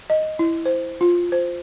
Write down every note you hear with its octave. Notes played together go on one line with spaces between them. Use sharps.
D#5
E4
C5
F4
C5